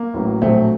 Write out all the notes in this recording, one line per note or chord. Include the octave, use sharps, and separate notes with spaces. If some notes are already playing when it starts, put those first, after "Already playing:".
Already playing: A#3
A1 A2 F#3
A#1 A2 F#3 A3 C4